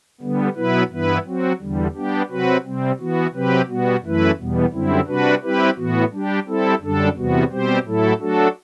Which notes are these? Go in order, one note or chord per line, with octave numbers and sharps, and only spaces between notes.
D3 G3 B3
B2 F#3 B3 E4 B4
G2 E3 B3 E4 B4
F#3 C4 F#4
E2 D3 G3
G3 B3 D4 G4
C3 F#3 C4 F#4 B4
C3 G3 C4
E3 B3 F#4
C3 F#3 C4 G4 B4
B2 G3 B3 F#4
F#2 E3 A3 E4 B4
E2 B2 G3 B3
F#2 D3 G3 C4 E4
C3 G3 D4 F#4 B4
G3 C4 E4 G4 B4
A2 E3 B3 F#4
G3 D4 G4
G3 C4 E4 A4
F#2 D3 G3 D4 A4
E2 C3 G3 B3 F#4
B2 G3 C4 G4 C5
A2 F#3 A3 E4 A4
F#3 A3 D4 F#4 A4